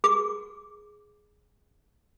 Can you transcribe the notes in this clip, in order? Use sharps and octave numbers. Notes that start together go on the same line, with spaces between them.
G#4 D6